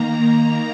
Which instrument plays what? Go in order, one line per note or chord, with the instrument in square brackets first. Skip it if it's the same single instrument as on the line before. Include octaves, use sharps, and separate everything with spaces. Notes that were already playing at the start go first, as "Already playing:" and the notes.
Already playing: [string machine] D#3 A#3 A#5